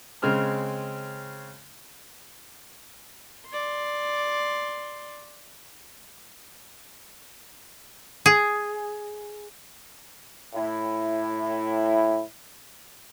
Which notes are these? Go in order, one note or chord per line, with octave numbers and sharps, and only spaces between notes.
C#3 G#3 C4 F6
D5 C6
G#4
A2 E4